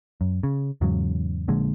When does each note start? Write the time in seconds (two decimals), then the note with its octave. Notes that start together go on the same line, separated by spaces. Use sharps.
0.21 F#2
0.43 C#3
0.81 E2 G#2 C#3 F#3
1.48 A#1 A#2 D3 G#3